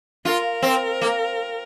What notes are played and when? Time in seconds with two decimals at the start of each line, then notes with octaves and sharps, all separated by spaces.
0.25 F4 A#4
0.62 C4
1.01 A#3